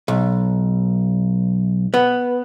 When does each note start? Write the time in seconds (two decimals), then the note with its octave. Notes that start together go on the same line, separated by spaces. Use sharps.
0.08 B1
1.94 B3